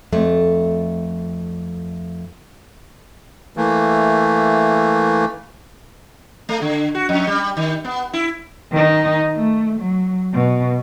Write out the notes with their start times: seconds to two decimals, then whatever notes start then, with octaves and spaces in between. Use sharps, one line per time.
0.12 F2 A3
3.57 E3 A3 A#3
6.49 A3
6.62 D3
6.95 F#4
7.09 F2
7.27 G3
7.57 D#3
7.85 B3
8.13 E4
8.71 D#3 D#4
9.36 A3
9.80 F#3
10.33 B2